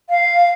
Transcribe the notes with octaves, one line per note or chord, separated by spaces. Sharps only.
F5